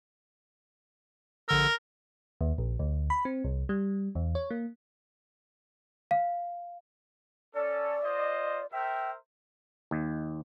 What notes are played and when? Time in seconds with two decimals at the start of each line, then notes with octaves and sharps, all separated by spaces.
1.49 A#1 D3 A#4 E6
2.41 D#2
2.58 A#1
2.79 D2
3.10 B5
3.25 C4
3.44 C2
3.69 G3
4.15 E2
4.35 C#5
4.51 A#3
6.11 F5
7.55 C#4 A4 D5
8.03 F4 C5 D#5
8.72 A#4 C5 E5 G5
9.91 D#2